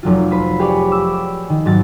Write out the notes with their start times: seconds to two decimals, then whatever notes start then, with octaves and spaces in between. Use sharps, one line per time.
0.03 F1 F#3 F4
0.31 B4 C5 B5
0.60 G4 G#4 B4 C#5 D5
0.91 D6 E6
1.50 D#3
1.65 G#2 F#3 A6